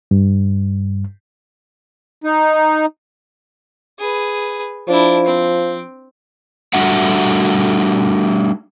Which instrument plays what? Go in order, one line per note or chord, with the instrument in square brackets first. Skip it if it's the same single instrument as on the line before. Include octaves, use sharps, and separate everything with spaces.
[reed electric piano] G2
[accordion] D#4
[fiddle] G#4 B4
[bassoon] F3 [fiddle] D4 E4
[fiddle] C4
[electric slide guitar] G3 A3 D4 F#4 E5 F#5